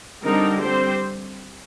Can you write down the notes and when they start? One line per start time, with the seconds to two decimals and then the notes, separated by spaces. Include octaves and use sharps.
0.23 D3 G3 C4 D#4 A#4
0.61 G3 C4 G4 C5